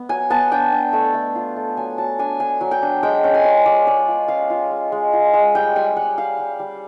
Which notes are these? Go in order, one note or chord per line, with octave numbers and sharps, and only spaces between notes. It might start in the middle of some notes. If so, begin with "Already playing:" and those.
Already playing: B3
F#3 G#5
B3 A5
D4 G5
D4
A3
A3
F4
A3
F#3 G#5
F#3 A5
D4 G#5
D4 G#5
F#3
G5
D4
G#3 G5
C#4
G#5
C#4
F4 D5
G#3 D5
F4
C#4 F5
F4
G#3
G#3
F4
G#3
G3 G5
G3 G#5
G3 F#5
G3 F5
G3
G3